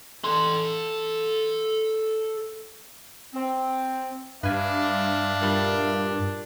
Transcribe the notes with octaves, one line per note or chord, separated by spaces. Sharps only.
A4 C6
C4
G2 D4 B4 E5 F5 G#5
A#2 G3